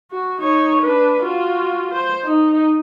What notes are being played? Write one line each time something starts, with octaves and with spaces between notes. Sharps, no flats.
F#4
D#4 C#5
D4 B4
F4 F#4
C5
D#4